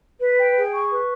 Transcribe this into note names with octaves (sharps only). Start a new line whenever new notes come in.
B4
G5
G#4
C#6
B4